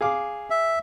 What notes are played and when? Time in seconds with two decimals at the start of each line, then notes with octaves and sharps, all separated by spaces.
0.01 G#4 F5 D6
0.50 E5